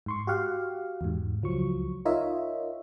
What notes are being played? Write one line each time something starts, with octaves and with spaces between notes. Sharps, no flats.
G#2 C6 C#6
F#4 G4 F5 F#5
E2 G#2
C#2 F3 F#3 C#6
D#4 F4 A#4 C#5 D#5 E5